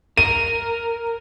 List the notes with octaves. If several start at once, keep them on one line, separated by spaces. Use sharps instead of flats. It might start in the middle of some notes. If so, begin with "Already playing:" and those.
A#4 D#7